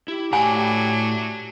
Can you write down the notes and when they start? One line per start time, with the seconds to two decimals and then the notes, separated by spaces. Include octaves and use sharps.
0.08 E4 G4
0.33 A2 F#3 D4 G#5 B5